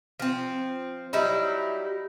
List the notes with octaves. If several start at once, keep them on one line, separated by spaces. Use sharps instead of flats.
F3 C4
F#3 G3 D#4 E4